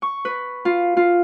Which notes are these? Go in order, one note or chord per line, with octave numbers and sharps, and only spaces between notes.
C#6
B4
F4
F4